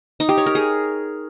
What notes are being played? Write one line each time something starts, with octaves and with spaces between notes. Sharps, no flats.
D#4
G4
C#5
A#4
G#4